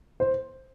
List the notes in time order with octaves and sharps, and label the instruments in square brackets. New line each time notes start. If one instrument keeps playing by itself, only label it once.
[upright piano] C5